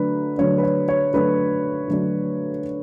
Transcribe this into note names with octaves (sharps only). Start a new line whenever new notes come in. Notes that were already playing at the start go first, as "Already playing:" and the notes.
Already playing: D3 F#3 A3 D4 B4
D3 F#3 A3 D4 C#5
B4
C#5
C#5
D3 F#3 A3 D4 B4
D3 F#3 A3 D4